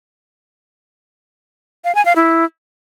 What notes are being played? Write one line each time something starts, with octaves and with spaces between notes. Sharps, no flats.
F5
G#5
F5
E4